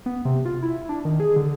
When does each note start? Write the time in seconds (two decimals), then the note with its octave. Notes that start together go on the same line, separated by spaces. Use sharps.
0.06 B3
0.25 C3
0.45 F4
0.62 E4
0.89 D4
1.05 D#3
1.20 G#4
1.36 D3